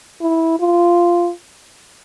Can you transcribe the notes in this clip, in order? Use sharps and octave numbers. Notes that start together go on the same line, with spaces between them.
E4
F4